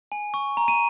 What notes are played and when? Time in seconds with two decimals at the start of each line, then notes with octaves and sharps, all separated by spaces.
0.12 G#5
0.34 C#6
0.57 A#5
0.68 D#7